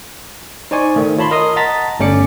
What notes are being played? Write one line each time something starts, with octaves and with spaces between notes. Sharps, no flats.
D#4 C5 D5 G#5 C#6
D#3 A3
F4 C#5 A5 B5 C6
A#4 D#5 A#5 C6 D#6
D#5 F#5 A5 A#5 A6 B6
G1 A3 C#4 D5 D6 C#7